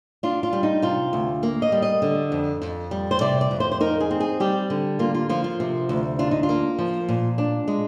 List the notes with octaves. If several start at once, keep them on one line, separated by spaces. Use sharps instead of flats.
D4 F4
F4
G3
D#4
C3 F4
D2
A#3
D#5
G3
D#5
D3
F2
F2
G3
C5
C3 D5
D5
F2
C5
C5
D#4 A#4
G#4
C4
G#4
G3 G4
D3
A#3 F4
F4
F3 F4
F4
C3
D2
D4 F4
D#4
F4
A#3
F3
A#2
D4
G#3